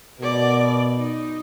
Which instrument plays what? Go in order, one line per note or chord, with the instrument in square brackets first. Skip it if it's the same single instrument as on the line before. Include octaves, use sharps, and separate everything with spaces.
[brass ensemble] B2 [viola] A#4 D5
[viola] D#4